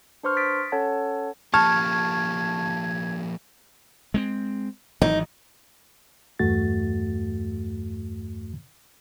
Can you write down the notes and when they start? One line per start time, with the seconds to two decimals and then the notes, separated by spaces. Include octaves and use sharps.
0.23 D4 B4 C5 C6 C#6 F6
0.36 D#6 A6 B6 D7
0.72 C#4 A4 C#5 F#5 A5
1.54 F3 A#3 G4 A5 C#6 F6 G#6
4.14 G#3 A#3 C4
5.02 G#1 E3 F#3 D#4
6.39 E2 G2 A3 F#4 A6